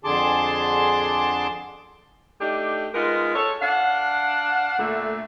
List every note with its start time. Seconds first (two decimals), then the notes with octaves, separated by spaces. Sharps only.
0.04 F2 D3 G#4 A5 C6 D6
2.41 A3 D4 D#4 G4
2.94 G#3 B3 D#4 F4 A#4
3.35 A4 C#5
3.62 D4 F5 F#5
4.79 A#2 D3 A3